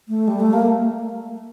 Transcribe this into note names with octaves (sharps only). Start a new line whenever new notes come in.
A3
G3
A3
A#3